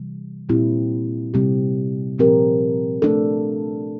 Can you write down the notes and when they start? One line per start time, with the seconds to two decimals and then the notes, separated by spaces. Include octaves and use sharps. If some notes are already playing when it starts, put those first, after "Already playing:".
Already playing: C3 E3 G3
0.49 A#2 G3 C4 E4 G4
1.34 C3 G3 C4 G4
2.18 A#2 F3 C4 G4 A#4
3.02 A3 D4 A4